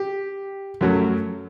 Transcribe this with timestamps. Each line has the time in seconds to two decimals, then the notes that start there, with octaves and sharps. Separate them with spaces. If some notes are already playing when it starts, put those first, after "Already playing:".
Already playing: G4
0.81 F#2 F#3 A3